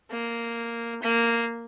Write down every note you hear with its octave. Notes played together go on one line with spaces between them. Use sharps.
A#3
A#3